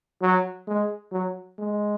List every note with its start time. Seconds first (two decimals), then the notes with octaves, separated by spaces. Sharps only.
0.21 F#3
0.67 G#3
1.12 F#3
1.58 G#3